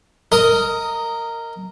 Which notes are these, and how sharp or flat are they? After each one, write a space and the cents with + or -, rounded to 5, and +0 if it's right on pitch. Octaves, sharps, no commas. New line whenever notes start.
A#4 -15 D#5 +10 D#6 +0